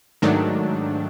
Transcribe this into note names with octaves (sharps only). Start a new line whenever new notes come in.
G#2 D#3 F#3 A3 D4